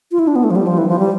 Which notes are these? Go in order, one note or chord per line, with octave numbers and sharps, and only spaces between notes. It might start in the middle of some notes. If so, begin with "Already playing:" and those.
F4
E4
D4
B3
A3
F3
G3
F3
E3
F3
G3